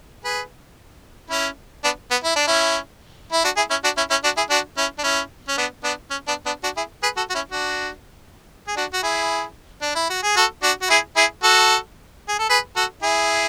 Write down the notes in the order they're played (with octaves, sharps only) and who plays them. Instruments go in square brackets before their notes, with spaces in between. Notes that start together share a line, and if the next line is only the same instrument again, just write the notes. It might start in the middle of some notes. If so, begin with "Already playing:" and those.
[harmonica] G#4 B4
C#4 E4
B3 D4
B3
E4
D4
C#4 E4
E4
D4 F#4
E4 G#4
C#4 E4
D4 F#4
C#4 E4
C#4 E4
D4 F#4
E4 G#4
D4 F#4
C#4 E4
D4
C#4 E4
C#4
B3 D4
B3 D4
C#4
B3 D4
B3 D4
D4 F#4
E4 G#4
G#4 B4
F#4 A4
F#4
C#4 E4
D4 F#4
G#4
D4 F#4
F#4
E4 G#4
D4
E4
F#4
G#4
F#4 A4
D4 F#4
F#4
E4 G#4
E4 G#4
F#4 A4
G#4
A4
G#4 B4
F#4 A4
E4 G#4